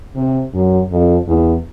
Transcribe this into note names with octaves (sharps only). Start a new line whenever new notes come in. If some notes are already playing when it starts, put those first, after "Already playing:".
C3
F#2
F2
E2